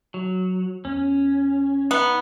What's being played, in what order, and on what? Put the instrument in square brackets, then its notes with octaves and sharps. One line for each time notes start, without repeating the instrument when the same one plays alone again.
[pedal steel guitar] F#3
[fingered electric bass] E2 [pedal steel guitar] C#4
[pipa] B3 [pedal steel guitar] D#4 F#5